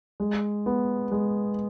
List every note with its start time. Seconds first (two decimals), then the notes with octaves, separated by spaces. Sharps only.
0.20 G#3
0.66 B3
1.12 G#3